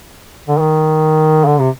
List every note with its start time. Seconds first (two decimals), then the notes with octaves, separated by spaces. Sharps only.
0.48 D3
0.59 D#3
1.45 D3
1.59 C3